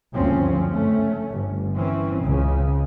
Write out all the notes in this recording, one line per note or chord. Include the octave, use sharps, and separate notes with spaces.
F#1 D2 G2 F3 C4 C#4
A3 C#4
G1
E3 C4 C#4
C#2 C#3